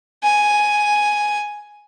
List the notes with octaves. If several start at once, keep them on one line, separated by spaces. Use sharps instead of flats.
G#5